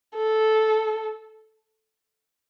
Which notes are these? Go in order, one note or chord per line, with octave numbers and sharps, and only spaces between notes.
A4